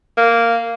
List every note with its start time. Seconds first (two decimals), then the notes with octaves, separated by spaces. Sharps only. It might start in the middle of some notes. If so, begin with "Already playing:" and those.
0.17 A#3